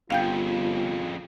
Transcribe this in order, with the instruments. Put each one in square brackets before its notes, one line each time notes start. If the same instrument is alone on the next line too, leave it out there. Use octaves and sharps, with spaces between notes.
[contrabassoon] G1 [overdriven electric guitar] F2 C#3 [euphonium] F4 [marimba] F5 G5 G6